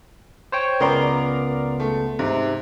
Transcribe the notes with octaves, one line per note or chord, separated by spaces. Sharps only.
C5 C#5 G5
C#2 B3 A#4 D5 A#5 C6
A3
G#2 C3